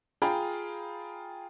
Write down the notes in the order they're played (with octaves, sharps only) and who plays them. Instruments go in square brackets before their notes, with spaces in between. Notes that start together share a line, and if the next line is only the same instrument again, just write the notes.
[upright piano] F4 G#4 G5 A#5 B5